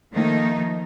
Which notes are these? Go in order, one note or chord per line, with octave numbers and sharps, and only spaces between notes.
D#3 F3 A3 A#3 D#4